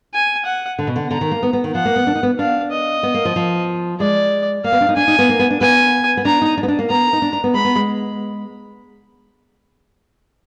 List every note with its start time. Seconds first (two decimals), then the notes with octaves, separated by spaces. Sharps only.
0.14 G#5
0.45 F#5
0.79 D3
0.87 B2
0.96 D3
1.10 D3 A#5
1.21 D#3
1.31 A#3
1.43 B3
1.53 B3
1.64 D#3
1.75 F3 F#5
1.86 A#3
1.96 B3
2.07 D4
2.15 D#4
2.23 B3
2.39 D4 F5
2.71 D#5
3.03 B3
3.14 A#3
3.25 F3
3.36 F3
4.00 G#3 D5
4.64 A#3 F5
4.72 B3
4.81 D4
4.89 D#4
4.97 D4 G#5
5.08 D#4
5.19 B3
5.29 A#3
5.39 B3
5.50 D4
5.61 B3 G#5
6.17 B3
6.25 D4 A#5
6.42 D#4
6.58 D4
6.63 B3
6.68 D4
6.79 A#3
6.90 B3 A#5
7.13 D#4
7.22 D4
7.33 D4
7.44 B3
7.54 G#3 B5
7.65 B3
7.76 G#3